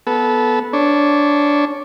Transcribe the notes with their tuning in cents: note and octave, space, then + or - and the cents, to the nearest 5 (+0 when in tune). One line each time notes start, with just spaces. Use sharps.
B3 -10 A4 -20
D4 -10 C#5 +0